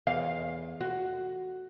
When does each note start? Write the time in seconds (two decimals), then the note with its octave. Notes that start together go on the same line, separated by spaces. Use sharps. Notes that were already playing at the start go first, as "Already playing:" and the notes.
0.07 E2 F5
0.81 F#4